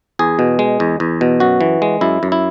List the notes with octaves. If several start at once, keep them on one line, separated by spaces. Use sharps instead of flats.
E2 G#4
B2
G#3
E2
E2
B2
F#2 F#4
E3
G#3
F#2 E4
F#2
E4